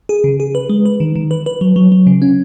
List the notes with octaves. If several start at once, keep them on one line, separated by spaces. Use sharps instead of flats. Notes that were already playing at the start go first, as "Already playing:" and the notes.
G#4
C#3
G#4
B4
G#3
B4
D#3
D#3
B4
B4
F#3
F#3
F#3
C#3
C#4